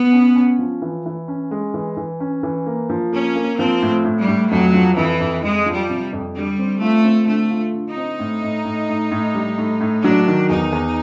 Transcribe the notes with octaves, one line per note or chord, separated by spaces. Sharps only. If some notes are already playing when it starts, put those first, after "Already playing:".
Already playing: B3
C#4
C#4
F3
E3
E3
C#4
G#3
E3
E3
C#4
E3
A#3
F3
A#3 C#4
A#3
F3 C4
A2
A2
G3
A2
F2 F#3
F3
F2 E3
F2
F2 G#3
F3
G3
C3
F2
D3 G3
C4
A3 F4
C4
D3 A3
F4
D3
D#4
C4
A2
A2
A2
A2
A2
G3
A2
A2
F#3 D4
D#3
E2 D#4
E2